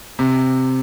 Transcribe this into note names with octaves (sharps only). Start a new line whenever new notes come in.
C3